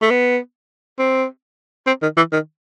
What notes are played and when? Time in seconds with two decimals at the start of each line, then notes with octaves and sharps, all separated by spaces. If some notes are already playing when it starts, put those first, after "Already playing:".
0.02 A3
0.11 B3
0.99 C4
1.87 C4
2.02 D#3
2.17 E3
2.32 D#3